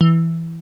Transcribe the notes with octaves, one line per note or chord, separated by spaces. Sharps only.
E3